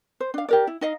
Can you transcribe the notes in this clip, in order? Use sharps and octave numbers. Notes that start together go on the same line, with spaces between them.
C5
D4 F5
G4 A#4 D5
E4
D#4 D#5 F5